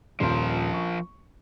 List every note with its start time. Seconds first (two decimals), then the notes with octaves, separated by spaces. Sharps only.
0.20 D#1 F3 A#4 C6
0.74 C#6